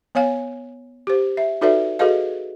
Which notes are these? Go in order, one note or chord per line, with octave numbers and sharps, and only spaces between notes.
B3 C#5 F5 G#5
G4 C5
E5
D#4 F#4 A4 B4 D5 E5
F#4 G#4 A4 B4 D#5 F5